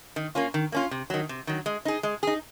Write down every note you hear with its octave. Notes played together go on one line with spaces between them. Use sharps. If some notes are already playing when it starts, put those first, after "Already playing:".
D#3
A#3 C#4 F4
D#3
A#3 C#4 F4
C3
D#3 F#3
C3
D#3 F#3
G#3
D#4 G#4
G#3
D#4 G#4